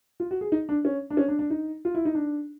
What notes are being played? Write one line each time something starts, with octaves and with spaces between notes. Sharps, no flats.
F4
F#4
G#4
D#4
D4
C#4
D4
C#4
D4
D4
D#4
F4
E4
D#4
D4